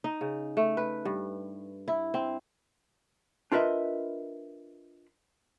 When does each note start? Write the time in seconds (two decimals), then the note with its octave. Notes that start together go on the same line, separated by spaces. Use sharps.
0.04 D#4
0.21 C#3
0.57 A3
0.77 B4
1.05 G2
1.88 E4
2.14 C4
3.52 D4 F4 A#4 B4 D#5 E5